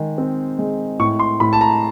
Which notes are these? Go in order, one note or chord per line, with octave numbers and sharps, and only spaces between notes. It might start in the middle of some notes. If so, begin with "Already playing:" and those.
Already playing: D#3 G#3
C4
G#3
A2 C#6
C6
A2 B5
A5
A#5